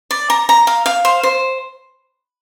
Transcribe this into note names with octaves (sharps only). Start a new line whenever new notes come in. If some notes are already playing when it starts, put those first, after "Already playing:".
D5
A#5
A#5
F5
F5
C5
C5